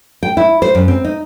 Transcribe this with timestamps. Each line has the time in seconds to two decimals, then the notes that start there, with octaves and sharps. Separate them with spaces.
0.23 G5
0.37 E4
0.62 C5
0.75 F#2
0.88 C4
1.04 D#4